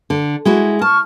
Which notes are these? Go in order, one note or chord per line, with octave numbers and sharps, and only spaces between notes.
D3
G#3 E4 F#4
A5 C#6 F6